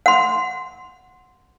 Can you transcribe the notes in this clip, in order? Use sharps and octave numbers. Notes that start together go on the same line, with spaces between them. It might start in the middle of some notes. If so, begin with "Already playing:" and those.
F#5 C6